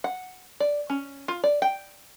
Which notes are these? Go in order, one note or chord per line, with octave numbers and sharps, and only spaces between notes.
F#5
D5
C#4
F4
D5
G5